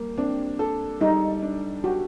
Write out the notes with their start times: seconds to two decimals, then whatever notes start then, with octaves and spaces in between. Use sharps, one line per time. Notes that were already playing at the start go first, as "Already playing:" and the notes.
Already playing: G3 A#3
0.18 C4 D4
0.59 A4
1.01 G3 D#4
1.42 D4
1.84 F#4 G4